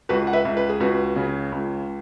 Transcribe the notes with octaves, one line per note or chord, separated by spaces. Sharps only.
C#2 F#4 B4
F#5
B4 E5
C#2
B4
G#4
C#2 F#4 B4
C#3
C#2